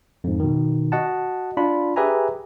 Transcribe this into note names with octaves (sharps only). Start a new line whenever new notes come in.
F2 G#2
B2 D#3
F#4 D#5 F#5 A5
D4 F4 B5
G4 G#4 B4 E5 G#5 A#5